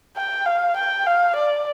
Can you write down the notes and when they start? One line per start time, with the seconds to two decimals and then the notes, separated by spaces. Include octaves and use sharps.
0.17 G5
0.46 F5
0.76 G5
1.06 F5
1.36 D5